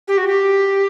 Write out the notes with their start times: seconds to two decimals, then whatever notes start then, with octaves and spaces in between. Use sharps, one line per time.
0.08 G4
0.18 F#4
0.27 G4